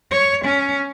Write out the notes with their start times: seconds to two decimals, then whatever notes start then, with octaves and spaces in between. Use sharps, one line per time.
0.11 C#5
0.44 C#4